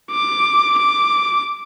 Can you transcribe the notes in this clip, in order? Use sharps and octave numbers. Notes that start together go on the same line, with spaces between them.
D6
D6